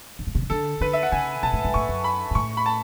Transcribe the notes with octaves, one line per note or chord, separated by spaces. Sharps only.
G#2
A2
B2
C#3
D3 A4
D3 B4
E5
F#5
C#3 G#5
B2 A5
A2
G#2
A2 C#6
F#2
B5
G#2
A2 C#6
B5
A5